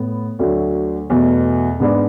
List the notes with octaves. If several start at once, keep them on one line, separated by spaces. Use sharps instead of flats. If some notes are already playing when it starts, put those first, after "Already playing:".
Already playing: A2 B3
D2 D3 F#3 A3
E2 B2 A3
G#2 G#3 B3 D4